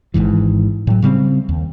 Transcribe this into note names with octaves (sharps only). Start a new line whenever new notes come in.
G#1 C#2 G#2 E3
A2 F#3
C#3 G3 A#3 C4
D#2